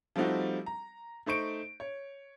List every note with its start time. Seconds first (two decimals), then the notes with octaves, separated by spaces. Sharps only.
0.16 F3 G3 A3 C4 D#4 F#4
0.66 A#5
1.26 A3 D#4 C5 C#6 D7
1.80 C#5